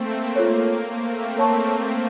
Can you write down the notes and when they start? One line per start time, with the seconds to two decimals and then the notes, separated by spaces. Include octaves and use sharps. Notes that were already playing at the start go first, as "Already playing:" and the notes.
Already playing: A3 A#3 C4
0.36 F4 A4 C#5
0.87 A3 C4
1.37 A#4 C#5 A5 C#6